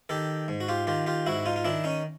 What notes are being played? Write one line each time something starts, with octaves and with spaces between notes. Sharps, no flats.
D#3 G4 A4
G#2
F#4
F4 G4
D#3 F4 G4
F4 G4
G#2 E4 F#4
D#4 F4
F4
D#3 D4 E4
C#4 D#4